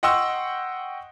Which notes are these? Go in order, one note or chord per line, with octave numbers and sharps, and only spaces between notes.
D#5 F#5 G5 C6 C#6 E6